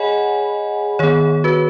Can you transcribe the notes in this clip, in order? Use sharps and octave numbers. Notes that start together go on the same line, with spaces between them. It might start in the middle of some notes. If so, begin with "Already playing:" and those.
Already playing: G#4 C#5 D#5 F#5 G#5 B5
D#3 B3 G#4 C#5
F#4 B4